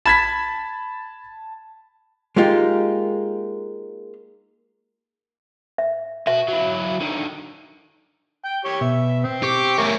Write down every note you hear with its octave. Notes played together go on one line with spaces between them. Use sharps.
A5 B5 G#6 B6
G#3 A#3 D#4 F4 G4
E5
B3 F#4 E5
F#3 E4
D3 D#3
G5
G4 C#5
B2 E5
C4
G4 C#6 D6
A3 A#4 C#5 E5 G#5